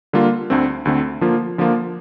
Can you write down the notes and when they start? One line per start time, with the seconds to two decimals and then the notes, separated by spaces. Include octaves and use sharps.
0.13 D3 G3 A#3 F4
0.50 D2 D3 A3 C4
0.85 D2 D3 A3 C4
1.21 D3 F3 A#3 F4
1.58 D3 F3 A#3 F4